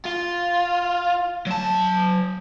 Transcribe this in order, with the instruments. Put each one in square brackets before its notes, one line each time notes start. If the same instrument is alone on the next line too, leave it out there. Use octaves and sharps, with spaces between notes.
[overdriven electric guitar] F4
F#3 A5